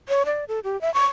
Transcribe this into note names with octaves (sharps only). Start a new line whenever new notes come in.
C#5
D5
A4
G4
E5
C#6